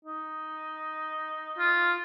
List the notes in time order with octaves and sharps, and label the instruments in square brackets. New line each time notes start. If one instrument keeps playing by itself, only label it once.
[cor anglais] D#4
[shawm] F4